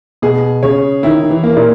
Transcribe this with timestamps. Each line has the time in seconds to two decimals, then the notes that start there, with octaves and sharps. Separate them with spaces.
0.22 B2 G#4
0.63 C#3 C#5
1.03 D#3 E4
1.23 D#3
1.30 E3
1.43 A#3
1.57 A#2